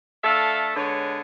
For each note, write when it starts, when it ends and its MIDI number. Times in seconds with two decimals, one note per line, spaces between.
0.24 0.72 57
0.24 0.72 62
0.24 0.72 69
0.24 0.72 76
0.24 0.72 77
0.76 1.21 50
0.76 1.21 56
0.76 1.21 59
0.76 1.21 73